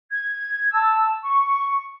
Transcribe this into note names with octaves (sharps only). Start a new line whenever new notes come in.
G#6
A5 E6
C#6